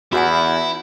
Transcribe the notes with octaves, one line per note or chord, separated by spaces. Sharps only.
E2 E4 F#4 F#5 G#5